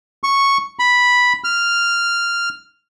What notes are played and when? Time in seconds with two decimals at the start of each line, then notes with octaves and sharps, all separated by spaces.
0.24 C#6
0.79 B5
1.44 F6